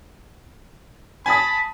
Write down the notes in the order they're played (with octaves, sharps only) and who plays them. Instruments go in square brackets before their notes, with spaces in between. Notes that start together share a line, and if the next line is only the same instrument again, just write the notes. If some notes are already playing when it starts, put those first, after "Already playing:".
[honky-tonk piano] G#5 A5 D#6 [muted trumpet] B5